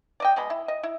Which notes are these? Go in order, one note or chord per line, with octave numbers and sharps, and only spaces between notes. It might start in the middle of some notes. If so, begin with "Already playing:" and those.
D5 D#5 G5
B2 G#3 D#5 B5
E4
D#5
E4